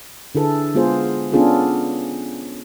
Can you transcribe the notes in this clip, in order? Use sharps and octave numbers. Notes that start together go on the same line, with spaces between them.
D3 E4 G#4 A4 B4
G#3 B3 F4 G#4 C5
B3 C#4 D4 F4 G#4 A4